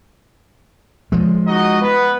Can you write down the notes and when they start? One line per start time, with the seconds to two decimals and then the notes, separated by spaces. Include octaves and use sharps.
1.12 F3 G#3
1.47 D#4 F#4 D#5
1.81 B3 B4